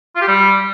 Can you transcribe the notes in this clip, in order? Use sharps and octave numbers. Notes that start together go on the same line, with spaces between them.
F4
G4
G3